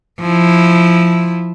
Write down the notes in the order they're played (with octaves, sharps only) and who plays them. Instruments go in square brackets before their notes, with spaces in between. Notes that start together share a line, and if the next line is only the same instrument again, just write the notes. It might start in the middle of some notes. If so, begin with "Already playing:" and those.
[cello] F3 E4